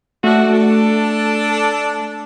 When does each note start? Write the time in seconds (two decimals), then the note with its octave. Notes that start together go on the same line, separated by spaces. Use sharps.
0.24 A3 D4 F#4
0.53 D4 A4